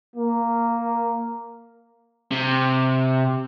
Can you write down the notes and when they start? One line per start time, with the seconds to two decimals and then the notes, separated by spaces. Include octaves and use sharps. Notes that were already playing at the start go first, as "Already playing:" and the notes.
0.16 A#3
2.31 C3